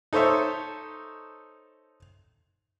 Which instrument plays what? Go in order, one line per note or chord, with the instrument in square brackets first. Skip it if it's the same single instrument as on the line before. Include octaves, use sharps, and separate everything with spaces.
[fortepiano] D#4 A4 C5 C#5 E5